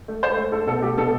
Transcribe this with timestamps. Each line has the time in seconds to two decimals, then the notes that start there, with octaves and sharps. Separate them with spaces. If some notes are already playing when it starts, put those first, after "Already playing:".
0.08 A3
0.23 A3 C5
0.37 A3
0.52 A3 A4
0.67 B2 A4
0.82 A3 G4
0.97 B2 A4